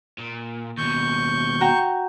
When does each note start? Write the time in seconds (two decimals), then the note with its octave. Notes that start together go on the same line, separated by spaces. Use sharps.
0.18 A#2
0.78 D#2 B2 C#6 G6
1.61 F#4 G5 A#5